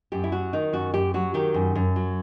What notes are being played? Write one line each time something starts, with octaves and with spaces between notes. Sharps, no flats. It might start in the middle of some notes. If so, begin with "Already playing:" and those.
F#2 G4
E4
F#3 F#4
D#3 D#4
F#2 F#4
F#2 G4
F#3 F#4
D#3 G4
F#2
F#2
F#3